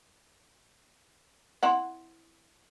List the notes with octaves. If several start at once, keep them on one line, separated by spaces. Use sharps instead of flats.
C4 E4 F#5